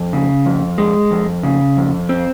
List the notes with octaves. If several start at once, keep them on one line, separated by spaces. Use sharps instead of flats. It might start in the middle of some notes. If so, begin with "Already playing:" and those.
Already playing: F2
C#3
F2
G#3
F2
C#3
F2
C4